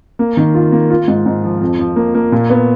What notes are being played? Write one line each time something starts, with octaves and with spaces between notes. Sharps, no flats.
A#3
D#3
F4
A#3
F4
G#2
G#2
F3
F2
F3
A#3
A#3
A#2
B3